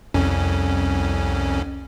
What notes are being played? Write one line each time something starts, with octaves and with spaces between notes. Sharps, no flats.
C2 F2 C#4